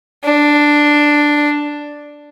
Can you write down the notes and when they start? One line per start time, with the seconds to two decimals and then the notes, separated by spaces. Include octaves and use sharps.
0.24 D4